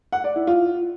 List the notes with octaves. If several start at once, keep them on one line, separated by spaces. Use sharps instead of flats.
F#5
D5
E4
F4